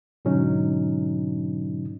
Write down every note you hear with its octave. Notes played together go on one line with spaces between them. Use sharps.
G#2 B2 D3 F#3 C#4 D#4